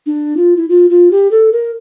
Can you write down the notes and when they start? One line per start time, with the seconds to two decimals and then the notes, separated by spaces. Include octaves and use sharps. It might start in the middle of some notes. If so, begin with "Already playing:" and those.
0.06 D4
0.37 F4
0.56 E4
0.69 F4
0.90 F4
1.11 G4
1.31 A4
1.52 A#4